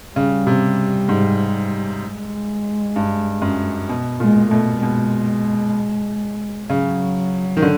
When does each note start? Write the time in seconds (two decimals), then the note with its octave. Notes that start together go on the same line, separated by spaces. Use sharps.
0.16 C#3 G3
0.47 C3
1.09 G#2
2.02 G#3
2.96 G2
3.42 F#2
3.89 B2
4.20 A#2 G#3
4.51 B2 A3
4.82 B2 G#3
6.69 C#3 F#3
7.57 D#3
7.62 D3